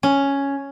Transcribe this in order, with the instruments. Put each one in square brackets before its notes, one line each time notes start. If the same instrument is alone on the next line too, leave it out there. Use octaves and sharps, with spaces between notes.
[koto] C#4